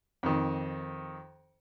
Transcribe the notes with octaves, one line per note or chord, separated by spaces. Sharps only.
F2 D#3